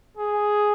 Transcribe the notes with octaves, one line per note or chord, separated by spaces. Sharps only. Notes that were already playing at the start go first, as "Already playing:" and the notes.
G#4